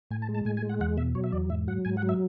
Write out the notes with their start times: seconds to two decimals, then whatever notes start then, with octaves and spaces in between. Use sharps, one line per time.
0.11 A2 G#5
0.22 A5
0.29 G#3
0.34 A5
0.45 A2 G#5
0.57 G#5
0.62 G#3
0.69 F#5
0.81 E2 F#5
0.97 B2 E5
1.15 F#3 C#5
1.24 E5
1.32 E2 D5
1.50 G#2 E5
1.68 F#3 F#5
1.85 G#2 G#5
1.97 F#5
2.02 F#3
2.09 E5